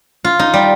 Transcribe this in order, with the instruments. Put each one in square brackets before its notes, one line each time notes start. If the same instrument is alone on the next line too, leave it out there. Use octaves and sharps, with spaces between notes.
[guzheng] F4
D#4
G3